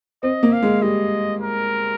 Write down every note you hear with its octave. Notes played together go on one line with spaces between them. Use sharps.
C4 D#5
A#3
F5
G#3
G3 D#5
A#4